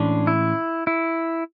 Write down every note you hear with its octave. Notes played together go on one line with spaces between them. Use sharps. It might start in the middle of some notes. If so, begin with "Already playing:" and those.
Already playing: A2 E3 G#3 C#4 D4
E4
E4